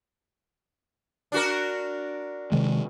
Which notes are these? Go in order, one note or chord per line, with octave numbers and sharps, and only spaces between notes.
D4 F#4 A#4
C3 D#3 G#3